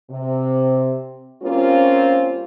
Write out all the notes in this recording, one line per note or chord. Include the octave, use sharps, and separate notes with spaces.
C3
G3 A#3 C4 C#4 F4